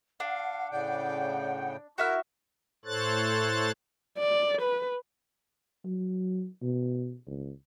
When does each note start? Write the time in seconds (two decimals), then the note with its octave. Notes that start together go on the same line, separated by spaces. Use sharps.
0.20 D4 F5 F#5
0.71 A2 C#3 D5 G5
1.98 E4 F#4 A#4 E5 F6
2.85 A2 A4 C5 C#5 F#6 A6
4.18 D5
4.62 B4
5.85 F#3
6.62 B2
7.27 C#2